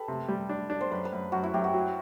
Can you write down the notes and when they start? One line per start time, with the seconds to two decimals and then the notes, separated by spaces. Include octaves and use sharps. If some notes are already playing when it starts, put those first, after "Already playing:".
Already playing: G4 A4 B4
0.08 C3
0.28 G3
0.49 D4
0.70 D4
0.81 C5
0.91 F#2 B4
1.05 B4
1.12 F#2
1.32 F#2 F#4
1.43 E4
1.54 F#2 G4
1.64 F#4
1.74 F#3